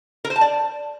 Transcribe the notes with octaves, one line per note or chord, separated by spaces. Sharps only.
A#4
C5
A5
D5